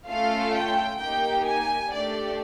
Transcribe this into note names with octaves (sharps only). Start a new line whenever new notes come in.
A3 C#4 F4 A4 F5
G5
A#3 D#4 G4 G5
G#5
A3 D4 G4 D5